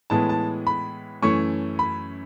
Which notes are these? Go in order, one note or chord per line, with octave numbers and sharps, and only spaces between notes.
A2 E3 G#3 B3 A5
A5
B5
F#2 E3 A3 C#4 C#6
B5